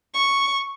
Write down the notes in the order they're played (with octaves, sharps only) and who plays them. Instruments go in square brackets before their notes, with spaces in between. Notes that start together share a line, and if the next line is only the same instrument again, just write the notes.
[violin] C#6